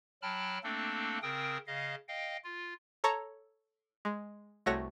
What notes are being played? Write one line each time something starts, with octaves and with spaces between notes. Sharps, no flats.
F#3 G5 A5 B5 F6
A3 A#3 C4 D4 A4
C#3 C4 A#4 G5 D#6
C#3 D#5 F5
D#5 F5 G5
F4
A4 C#5 A5 A#5
G#3
C2 A3 F#4 C#5 A#6